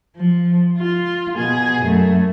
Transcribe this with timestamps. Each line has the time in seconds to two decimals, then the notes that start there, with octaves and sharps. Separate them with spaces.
0.17 F3
0.78 F4
1.37 B2 G#4
1.84 F#2 A3